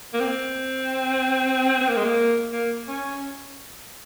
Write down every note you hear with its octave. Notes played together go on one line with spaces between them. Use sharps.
A#3
C4
C4
A#3
G#3
A#3
A#3
C#4